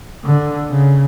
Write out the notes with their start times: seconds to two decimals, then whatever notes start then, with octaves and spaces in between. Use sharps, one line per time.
0.25 D3
0.71 C#3